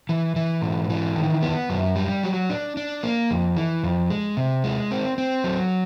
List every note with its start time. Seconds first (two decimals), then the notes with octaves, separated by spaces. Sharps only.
0.09 E3
0.36 E3
0.62 G#2
0.89 E3
1.16 D#3
1.42 B3
1.70 F#2
1.96 G3
2.23 F#3
2.50 D4
2.77 D4
3.03 A#3
3.31 F2
3.57 E3
3.84 F2
4.10 G#3
4.37 C3
4.64 G#3
4.91 C4
5.18 C4
5.44 F#3